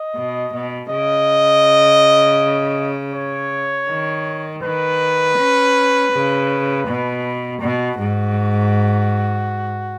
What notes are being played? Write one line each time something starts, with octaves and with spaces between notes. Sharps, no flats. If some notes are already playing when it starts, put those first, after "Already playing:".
Already playing: D#5
B2
B2
C#3 D#5
C#5
D#3
D#3 B4
C#4
C#3
B2
B2 F#4
G#2